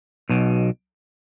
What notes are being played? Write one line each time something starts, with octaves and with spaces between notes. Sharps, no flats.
B1 B2